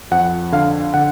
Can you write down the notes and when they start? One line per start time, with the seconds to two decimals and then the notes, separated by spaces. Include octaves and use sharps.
0.11 F2 F#5
0.52 D3 F5
0.94 D3 F#5